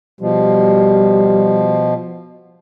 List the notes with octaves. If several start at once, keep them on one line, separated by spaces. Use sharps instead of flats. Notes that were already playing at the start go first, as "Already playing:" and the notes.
B2 F3 G3